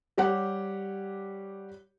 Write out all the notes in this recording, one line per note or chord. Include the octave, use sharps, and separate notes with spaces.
G3 G4 C#5 F#5